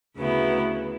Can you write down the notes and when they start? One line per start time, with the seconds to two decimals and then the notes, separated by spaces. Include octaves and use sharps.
0.16 D2 C#3 F#3 B3 E4